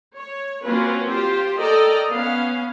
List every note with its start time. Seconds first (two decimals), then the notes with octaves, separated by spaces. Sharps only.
0.15 C#5
0.65 F#3 A#3 C4 C#4 F4 B4
1.09 F4 G4 C5
1.60 A4 A#4 D5 D#5 G5 A#5
2.11 B3 C#4 F5